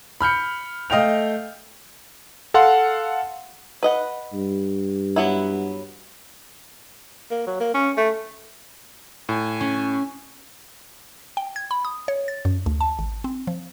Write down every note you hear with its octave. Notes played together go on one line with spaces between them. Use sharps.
B5 F6 G6 C#7
A3 D#5 F5 G5 F7
A4 F5 F#5 C6
B4 D#5 F#5
G2
F#3 B3 E4
A#3
F#3
A#3
C#4
A3
A2 G#5
C#4
G5
G#6
B5
D#6
C#5
A6
F#2
D2
A5
G#1
C4
F3